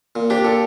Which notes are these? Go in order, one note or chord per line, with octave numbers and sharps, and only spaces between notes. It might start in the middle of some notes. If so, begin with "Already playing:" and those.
A#2
D4 G4
A#2 A4